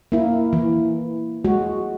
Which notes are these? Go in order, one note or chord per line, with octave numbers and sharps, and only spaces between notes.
A#3 E4
E3
G#3 F#4